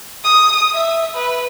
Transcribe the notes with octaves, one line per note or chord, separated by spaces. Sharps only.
D#6
E5
B4